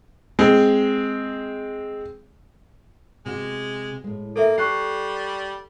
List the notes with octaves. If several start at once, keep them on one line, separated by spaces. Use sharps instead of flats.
G#3 C4
C3 G#3 F#4
A2 G#3
A#3 A4 A#4 E5
G3 A4 C#6 F#6 C7